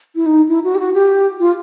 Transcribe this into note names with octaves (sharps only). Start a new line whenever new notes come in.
E4
D#4
E4
F#4
G4
F#4
G4
F4